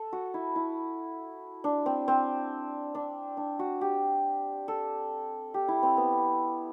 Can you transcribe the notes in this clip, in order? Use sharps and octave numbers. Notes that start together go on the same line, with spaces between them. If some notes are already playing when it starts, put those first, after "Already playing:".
Already playing: A4
F#4
E4
E4
D4
C4
C4
D4
D4
F#4
G4
A4
G4
E4
C4
B3